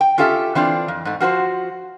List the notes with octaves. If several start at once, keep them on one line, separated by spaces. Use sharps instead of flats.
G5
C#4 F4 G4 A4 E5
E3 C4 D4 F4
F2
G#2 A3
F3 F#4 B4 C5